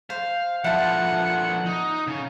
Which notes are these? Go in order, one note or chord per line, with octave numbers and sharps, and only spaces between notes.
C5 F5
D3 F3 E4 F#5 A5
D#4
C#3